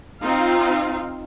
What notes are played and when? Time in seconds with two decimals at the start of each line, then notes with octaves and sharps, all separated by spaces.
0.19 C4 D#4 F4 F5